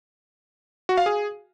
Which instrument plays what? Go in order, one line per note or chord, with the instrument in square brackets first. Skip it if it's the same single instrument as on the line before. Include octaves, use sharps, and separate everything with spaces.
[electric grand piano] F#4
F5
G#4